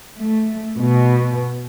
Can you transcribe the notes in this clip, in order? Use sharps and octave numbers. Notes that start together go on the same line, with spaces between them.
A3
B2